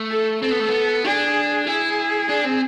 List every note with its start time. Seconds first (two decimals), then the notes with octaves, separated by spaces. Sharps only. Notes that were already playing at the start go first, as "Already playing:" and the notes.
Already playing: A3
0.11 A4
0.42 C4 A4
0.51 B3
0.60 A3
0.68 B3
1.05 D4 G#4
1.67 E4 G#4
2.29 D4
2.45 C4